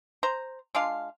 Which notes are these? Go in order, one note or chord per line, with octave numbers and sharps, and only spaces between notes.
C5 A#5
G#3 D4 F4 F5